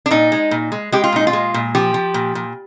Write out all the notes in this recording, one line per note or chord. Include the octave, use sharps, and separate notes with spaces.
D4
A#2 D#4
G#3
A#2
G#3
G#3 G4
F4
A#2 D#4
F4
G#3
A#2
F3 G4
F3
A#2
A#2